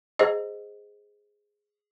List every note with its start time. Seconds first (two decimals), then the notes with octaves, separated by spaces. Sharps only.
0.19 G#4 C5 D#5